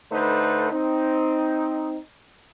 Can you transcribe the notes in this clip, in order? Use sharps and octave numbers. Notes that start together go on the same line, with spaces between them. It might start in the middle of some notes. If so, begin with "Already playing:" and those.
D3 A3 D#4 B4 C5
C4 D#4